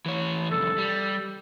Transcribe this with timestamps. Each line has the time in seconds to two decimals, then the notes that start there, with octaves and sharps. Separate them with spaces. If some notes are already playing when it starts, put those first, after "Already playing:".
0.06 E3 C#5
0.51 C2 F2 A4
0.78 G3